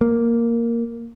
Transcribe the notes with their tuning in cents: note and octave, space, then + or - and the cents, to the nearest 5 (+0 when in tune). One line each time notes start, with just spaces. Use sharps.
A#3 +0